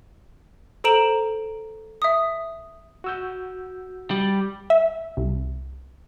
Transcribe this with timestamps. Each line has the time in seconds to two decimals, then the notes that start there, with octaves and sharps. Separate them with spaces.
0.84 A4 C5 A#5 D7 E7 F#7
2.02 E5 D#6
3.04 F#4 E6 G6
4.11 G3
4.70 E5
5.17 C2